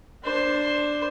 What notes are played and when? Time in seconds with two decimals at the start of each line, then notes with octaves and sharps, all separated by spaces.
0.24 D4 C5